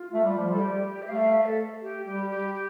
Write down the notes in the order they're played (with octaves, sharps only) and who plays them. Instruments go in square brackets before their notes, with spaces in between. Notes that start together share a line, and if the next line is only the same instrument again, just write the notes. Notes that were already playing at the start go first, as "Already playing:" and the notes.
Already playing: [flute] F4
[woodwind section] A3
G3
F3
[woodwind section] G3 [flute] A4
[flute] G4
E5
[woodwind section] A3 [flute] F5
[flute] F5
E5
A4
G4
[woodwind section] G3 [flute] G4
[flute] G4
G4